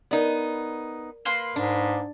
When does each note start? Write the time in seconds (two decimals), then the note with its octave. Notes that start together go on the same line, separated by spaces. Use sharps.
0.11 B3 D#4 A#4 D5
1.25 A#3 B4 C6
1.56 G#2 D4